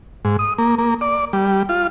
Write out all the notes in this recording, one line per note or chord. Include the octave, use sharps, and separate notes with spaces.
G#2
D#6
A#3
A#3
D5
G3
F4